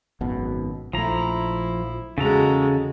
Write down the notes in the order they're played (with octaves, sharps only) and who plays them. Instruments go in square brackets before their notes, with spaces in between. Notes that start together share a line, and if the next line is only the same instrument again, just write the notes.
[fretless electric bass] G#1 F#2 B2
[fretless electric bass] A#1 A3 [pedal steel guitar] F3 A#5 [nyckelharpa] E4
[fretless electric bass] E2 [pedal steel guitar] C#3 A4 A#5 [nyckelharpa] G#3 F#4